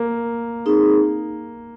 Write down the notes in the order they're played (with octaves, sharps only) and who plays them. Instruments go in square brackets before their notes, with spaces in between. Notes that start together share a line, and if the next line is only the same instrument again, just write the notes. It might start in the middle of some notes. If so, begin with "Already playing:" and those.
Already playing: [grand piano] A#3
[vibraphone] C4 D#4 G#4